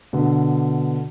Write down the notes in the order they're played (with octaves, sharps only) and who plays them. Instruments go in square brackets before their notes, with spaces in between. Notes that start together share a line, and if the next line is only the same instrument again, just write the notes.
[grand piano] B2 D3